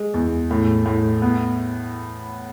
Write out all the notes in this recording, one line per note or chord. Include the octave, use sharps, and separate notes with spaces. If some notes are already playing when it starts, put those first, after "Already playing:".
Already playing: G#3
E2
A2
A2
B3